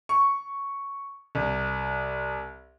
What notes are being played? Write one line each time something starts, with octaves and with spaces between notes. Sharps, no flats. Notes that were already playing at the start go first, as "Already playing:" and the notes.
C#6
C2